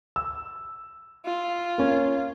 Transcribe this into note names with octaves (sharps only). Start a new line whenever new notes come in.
E6
F4
A#3 C#4